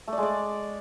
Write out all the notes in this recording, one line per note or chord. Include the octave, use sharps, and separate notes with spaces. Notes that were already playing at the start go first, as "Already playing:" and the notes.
A3
D5
G#3
D5